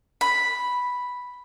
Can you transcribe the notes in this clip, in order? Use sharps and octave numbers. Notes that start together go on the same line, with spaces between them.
B5